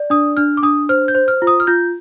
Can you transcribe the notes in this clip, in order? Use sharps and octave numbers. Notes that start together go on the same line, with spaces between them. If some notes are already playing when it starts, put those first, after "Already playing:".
Already playing: D5
D4 D#6
D4 F6
D6
D4 D#6
C5 F6
G6
C5
F6
F4
D#6
F6
F4 G6